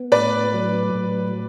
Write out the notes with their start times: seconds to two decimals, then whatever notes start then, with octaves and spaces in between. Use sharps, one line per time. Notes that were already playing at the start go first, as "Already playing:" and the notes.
Already playing: B3
0.12 A2 B4 D5
0.54 F#3
0.95 A2